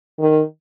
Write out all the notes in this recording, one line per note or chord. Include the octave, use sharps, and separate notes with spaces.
D#3